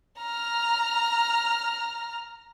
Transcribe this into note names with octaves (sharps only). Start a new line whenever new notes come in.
A#5 F6